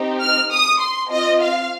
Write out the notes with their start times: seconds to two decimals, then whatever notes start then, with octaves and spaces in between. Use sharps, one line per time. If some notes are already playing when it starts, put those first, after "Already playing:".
Already playing: C4 D#4 G4
0.21 F6
0.51 D#6
0.81 C6
1.11 C4 F4 D#5
1.42 F5